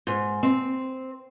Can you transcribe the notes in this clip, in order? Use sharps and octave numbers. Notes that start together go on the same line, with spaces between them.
G#2
C4